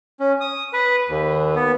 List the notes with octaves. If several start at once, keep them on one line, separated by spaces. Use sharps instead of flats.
C#4
D#6
B4
D#2
B3